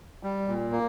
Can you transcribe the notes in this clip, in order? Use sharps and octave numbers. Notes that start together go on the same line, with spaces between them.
G3
A#2
A#3